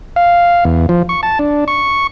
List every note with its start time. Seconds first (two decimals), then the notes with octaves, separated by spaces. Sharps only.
0.16 F5
0.65 E2
0.89 F3
1.09 C#6
1.23 A5
1.39 D4
1.68 C#6